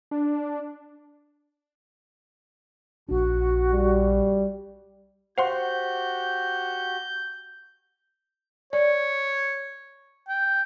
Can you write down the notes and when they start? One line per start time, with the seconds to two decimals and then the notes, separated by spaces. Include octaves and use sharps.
0.11 D4
3.09 A#1 D4 F#4
3.71 G3
5.38 F#4 G4 C5 F5 F#5 C6 G6
8.73 C#5 D5
10.28 G5